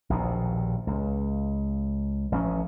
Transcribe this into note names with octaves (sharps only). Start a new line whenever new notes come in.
A#1 D#2 B2
C#2
A1 F3 C4 C#4